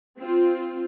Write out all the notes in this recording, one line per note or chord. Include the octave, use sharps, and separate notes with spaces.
C4 F4